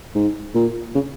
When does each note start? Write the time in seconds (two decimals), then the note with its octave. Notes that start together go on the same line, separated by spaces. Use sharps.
0.15 G#2
0.54 A#2
0.95 C#3